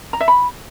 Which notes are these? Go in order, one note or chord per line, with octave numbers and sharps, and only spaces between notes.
A#5
E5
B5